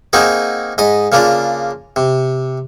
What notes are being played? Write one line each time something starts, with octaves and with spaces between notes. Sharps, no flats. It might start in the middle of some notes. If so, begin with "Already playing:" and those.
A#3 C4 D#4 F#4 G#4
G#2 D#5 D#6
C#3 A#3 D4 F4
C3